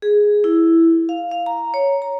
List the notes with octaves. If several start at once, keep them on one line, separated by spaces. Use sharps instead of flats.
G#4
E4
F5
F5
A#5
C#5
A#5